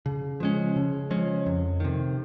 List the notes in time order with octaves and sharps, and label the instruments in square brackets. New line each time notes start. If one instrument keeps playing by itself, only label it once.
[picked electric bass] C#3
F3 G#3 C#4
C#3
F3 G#3 C#4
F2
C3 D#3